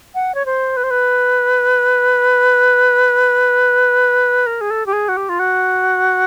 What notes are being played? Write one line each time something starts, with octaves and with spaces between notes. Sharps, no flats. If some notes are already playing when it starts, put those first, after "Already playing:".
F#5
C#5
C5
B4
C5
B4
A#4
G#4
A4
G4
G#4
F#4
G4
F4
F#4